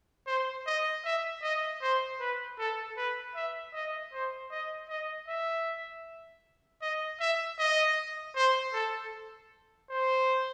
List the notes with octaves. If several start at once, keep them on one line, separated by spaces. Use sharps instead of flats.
C5
D#5
E5
D#5
C5
B4
A4
B4
E5
D#5
C5
D#5
D#5
E5
D#5
E5
D#5
C5
A4
C5